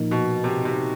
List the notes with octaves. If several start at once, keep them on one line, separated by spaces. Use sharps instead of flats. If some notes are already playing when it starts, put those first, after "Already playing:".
Already playing: A#2 F3 A#3 D#4
B2
C3
C3